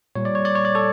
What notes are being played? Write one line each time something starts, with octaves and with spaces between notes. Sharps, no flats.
A#2 G3 C#5
D5
C#5
D5
C#5
D5
A4 C#5